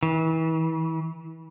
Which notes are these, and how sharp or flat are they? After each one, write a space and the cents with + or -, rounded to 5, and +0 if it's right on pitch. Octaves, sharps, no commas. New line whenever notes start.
E3 -35